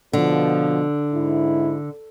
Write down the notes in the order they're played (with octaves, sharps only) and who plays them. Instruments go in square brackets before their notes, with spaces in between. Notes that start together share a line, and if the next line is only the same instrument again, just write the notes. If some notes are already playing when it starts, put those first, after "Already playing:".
[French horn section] B2 F3 [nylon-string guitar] D3
[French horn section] G#2 E4